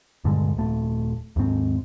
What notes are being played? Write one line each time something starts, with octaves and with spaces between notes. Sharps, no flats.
D#1 G2 D3 G#3
D#1 A3
D#2 G#2 C4